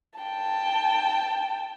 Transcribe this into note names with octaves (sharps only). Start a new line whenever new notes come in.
G5 A5